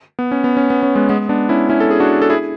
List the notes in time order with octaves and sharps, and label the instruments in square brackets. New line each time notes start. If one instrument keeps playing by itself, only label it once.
[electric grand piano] B3
C#4
B3
C#4
B3
C#4
G#3 B3
G#3 B3
B3 D4
C#4 E4
C#4 E4
A4
G#4
D4 F#4
A4
E4 G#4